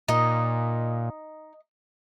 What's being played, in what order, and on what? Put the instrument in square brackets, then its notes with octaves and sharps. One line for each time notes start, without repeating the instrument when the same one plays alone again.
[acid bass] A#2 [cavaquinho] D#4 D#5